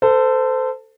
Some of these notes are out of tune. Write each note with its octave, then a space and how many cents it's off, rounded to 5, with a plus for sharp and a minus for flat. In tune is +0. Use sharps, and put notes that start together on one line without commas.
A4 +15 C5 -25